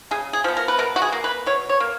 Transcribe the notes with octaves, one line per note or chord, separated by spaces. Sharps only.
C#3 G#4
G#4
F3 B3
A#4
B4
B2 A#4
F#4
G#4
A#3
B4
B2 C#5
C#5
A#3